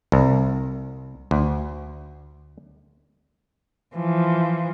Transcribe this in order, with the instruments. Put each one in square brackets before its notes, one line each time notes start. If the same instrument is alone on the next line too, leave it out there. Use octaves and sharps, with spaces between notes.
[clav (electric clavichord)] C2
D2
[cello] E3 F3